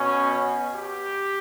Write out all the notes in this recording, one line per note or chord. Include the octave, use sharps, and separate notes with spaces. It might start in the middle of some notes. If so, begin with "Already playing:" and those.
Already playing: B2 C#4
G4